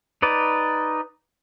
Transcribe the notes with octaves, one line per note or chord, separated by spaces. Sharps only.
D#4 B4 D5